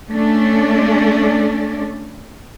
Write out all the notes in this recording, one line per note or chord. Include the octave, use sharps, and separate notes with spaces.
A3 C#4 D4 D5